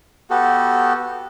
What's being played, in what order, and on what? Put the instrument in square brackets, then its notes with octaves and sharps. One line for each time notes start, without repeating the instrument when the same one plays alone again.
[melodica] B3 F#4 G4 A4